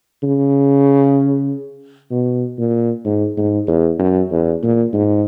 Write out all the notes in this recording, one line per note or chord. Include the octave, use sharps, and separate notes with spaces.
C#3
B2
A#2
G#2
G#2
E2
F#2
E2
A#2
G#2